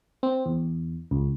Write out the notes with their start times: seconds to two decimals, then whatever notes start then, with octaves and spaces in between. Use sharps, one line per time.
0.23 C4
0.46 E2
1.11 C#2